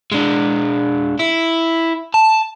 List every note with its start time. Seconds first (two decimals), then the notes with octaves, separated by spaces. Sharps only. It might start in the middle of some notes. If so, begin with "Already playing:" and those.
0.12 G#3 D4
1.19 E4
2.14 A5